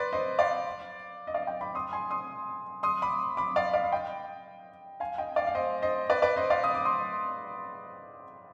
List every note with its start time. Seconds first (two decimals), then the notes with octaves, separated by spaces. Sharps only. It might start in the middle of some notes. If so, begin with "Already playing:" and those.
Already playing: B4 D5 C6
0.13 C5 D#5
0.39 D5 F5
1.27 D#5
1.34 D5 F5
1.47 D#5 G5
1.61 B5 D6
1.75 C6 D#6
1.93 G#5 C6
2.11 C6 D#6
2.83 C6 D#6
3.02 B5 D6
3.37 B5 D6
3.56 D5 F5
3.73 D5 F5
3.84 F5
3.92 D#5 G5
5.00 F5 G#5
5.18 D#5 G5
5.36 D5 F5
5.47 F5
5.55 C5 D#5
5.82 C5 D#5
6.10 B4 D5
6.22 B4 D5
6.36 C5 D#5
6.50 D5 F5
6.64 D#6
6.75 D6
6.85 C6 D#6